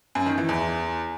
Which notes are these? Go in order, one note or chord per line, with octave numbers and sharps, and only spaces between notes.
F#2
D#3
E3
E2